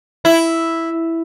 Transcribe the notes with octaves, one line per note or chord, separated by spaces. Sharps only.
E4